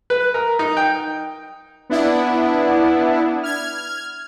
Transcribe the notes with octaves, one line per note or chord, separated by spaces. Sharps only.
B4
A#4
D#4
G5
B3 D4 E4
F6 G#6